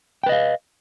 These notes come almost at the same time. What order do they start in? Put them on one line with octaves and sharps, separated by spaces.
G5 B4 D#5 F5